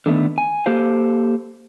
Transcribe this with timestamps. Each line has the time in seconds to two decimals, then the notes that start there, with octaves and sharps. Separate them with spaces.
0.06 D3 D#3 A3 B3
0.38 G#5
0.66 A#3 G4 A4 C5 F5